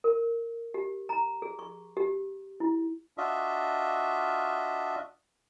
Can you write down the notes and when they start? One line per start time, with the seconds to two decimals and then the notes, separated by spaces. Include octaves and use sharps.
0.04 A#4
0.74 G4
1.09 A#5
1.42 G#4
1.59 C#6
1.97 G4
2.60 E4
3.18 D4 F4 F#4 D#5 E5